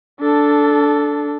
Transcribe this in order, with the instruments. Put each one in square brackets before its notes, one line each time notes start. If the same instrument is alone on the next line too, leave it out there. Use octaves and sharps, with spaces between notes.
[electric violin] D4 A4